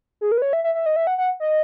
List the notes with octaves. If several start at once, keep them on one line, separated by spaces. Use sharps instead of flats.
G#4
A#4
B4
C#5
E5
E5
E5
D#5
E5
F#5
F#5
D#5